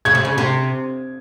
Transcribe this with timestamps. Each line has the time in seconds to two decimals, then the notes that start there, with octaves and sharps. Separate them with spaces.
0.05 C#3 G#6
0.15 C3
0.25 C#3
0.38 C3